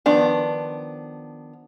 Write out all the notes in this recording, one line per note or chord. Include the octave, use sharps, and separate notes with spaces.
D#3 F3 B3 D4